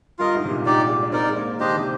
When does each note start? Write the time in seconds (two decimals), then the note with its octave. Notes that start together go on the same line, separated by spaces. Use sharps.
0.19 G2 F4 A#4 D#5
0.35 G#2
0.45 C3
0.50 A#2
0.65 A#2 D#4 G4 D5
0.89 G#3
1.02 D4
1.12 C4 D#4 A#4 D5
1.29 G#3
1.36 A#3
1.59 D#3 D4 G4 C5 D#5
1.77 C3